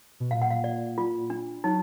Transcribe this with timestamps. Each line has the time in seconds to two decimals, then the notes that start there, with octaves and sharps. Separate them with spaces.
0.20 B2
0.31 A#2 F5
0.42 F#5
0.50 F5
0.64 D5
0.98 F4
1.30 D4
1.64 F#3 D#4